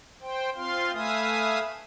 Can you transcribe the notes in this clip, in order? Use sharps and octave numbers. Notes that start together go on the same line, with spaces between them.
C5 G5
C4 F4 F5 C6
A3 B4 E5 F5 G#5 D#6